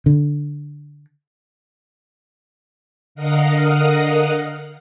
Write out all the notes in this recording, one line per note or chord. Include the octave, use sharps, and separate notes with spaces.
D3
D3 A#4 D#5 F5 F#5 D#6